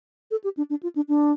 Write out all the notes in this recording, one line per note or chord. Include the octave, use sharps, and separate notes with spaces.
A4
G4
D4
D4
F4
D4
D4